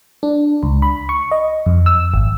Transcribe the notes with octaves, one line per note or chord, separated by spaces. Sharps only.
D4
C#2
B5
C#6
D#5
F2
E6
G#1